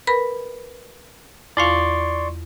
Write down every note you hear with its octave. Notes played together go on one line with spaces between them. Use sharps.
A#4 B4 B5
E2 F4 D5 F5 C6 C#6